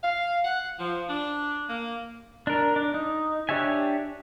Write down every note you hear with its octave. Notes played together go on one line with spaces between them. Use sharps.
F5
F#5
F3
D4
A#3
D4 A#4
D4
D#4
D4 G4 C#5 E5 G#5